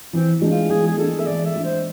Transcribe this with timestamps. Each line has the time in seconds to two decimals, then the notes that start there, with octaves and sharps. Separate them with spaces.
0.13 E3 C4
0.42 G#3 D4
0.51 F4
0.70 E3 G#4
0.87 G#4
0.98 G#3 D4 A4
1.20 E5
1.27 E3 D5
1.46 E5
1.56 G#3 D4
1.65 C5